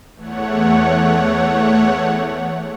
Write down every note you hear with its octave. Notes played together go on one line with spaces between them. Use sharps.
E2 A3 C#5 F#5